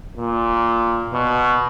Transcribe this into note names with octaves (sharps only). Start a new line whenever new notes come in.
A#2
B2